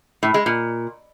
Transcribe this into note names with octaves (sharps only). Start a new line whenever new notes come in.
A2
G#3
A#2